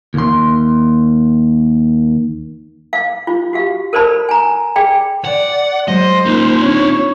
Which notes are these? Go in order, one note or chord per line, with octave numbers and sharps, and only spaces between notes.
D#2 C6
F5
F4
F#4 G4 F5
A4 A#4 C5 D5 A5 B5
G#5 A#5
G#4 D5 G5 B5
D5 F#5
F#3 G#3 C5 D#5
A#3 D#4 F4
C4 D4 C#5